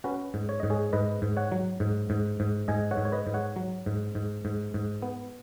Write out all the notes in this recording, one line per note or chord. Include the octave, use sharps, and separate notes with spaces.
C#4 F#4 B4
G#2
C#5
G#2 D#5
G#4 C#5
G#2 B4 D#5
G#2
C#5 F#5
F#3
G#2
G#2
G#2
G#2 D#5 G#5
C#5 F#5
G#2
C#5
B4 D#5
G#2
C#5 F#5
F#3
G#2
G#2
G#2
G#2
B3